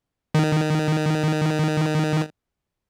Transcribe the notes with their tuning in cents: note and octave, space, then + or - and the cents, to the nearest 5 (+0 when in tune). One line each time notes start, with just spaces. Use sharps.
D#3 -15